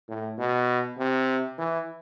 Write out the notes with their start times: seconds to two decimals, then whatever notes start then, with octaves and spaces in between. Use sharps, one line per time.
0.09 A2
0.39 B2
0.98 C3
1.58 E3